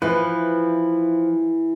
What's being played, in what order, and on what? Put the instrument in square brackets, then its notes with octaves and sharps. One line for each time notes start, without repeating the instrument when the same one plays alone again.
[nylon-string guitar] E3 [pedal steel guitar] F3 B4